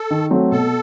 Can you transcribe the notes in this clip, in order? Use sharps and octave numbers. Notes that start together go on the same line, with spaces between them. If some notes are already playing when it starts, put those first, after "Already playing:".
Already playing: A4
D#3
F#3 A3 C4
B2 A4